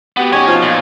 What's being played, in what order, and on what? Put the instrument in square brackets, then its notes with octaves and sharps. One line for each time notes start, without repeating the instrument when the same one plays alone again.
[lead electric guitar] B3 [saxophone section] F#4 G4
[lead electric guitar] C#4 G#5 [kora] D#4 C#5
[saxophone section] B2 F3
[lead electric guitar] A#2